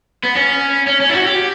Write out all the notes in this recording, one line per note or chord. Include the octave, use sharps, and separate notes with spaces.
B3
C#4
C#4
C#4
E4
F#4
G4